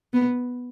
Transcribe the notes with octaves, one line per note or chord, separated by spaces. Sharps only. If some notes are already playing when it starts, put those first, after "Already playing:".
B3